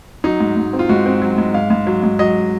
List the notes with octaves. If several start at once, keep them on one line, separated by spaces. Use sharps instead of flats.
F#3 D#4
G#2
G#2
C4
F4
G#2 F#4
C4
F#3
G#2
G#2 F5
G#2
F#3
G#2
F#3 D#5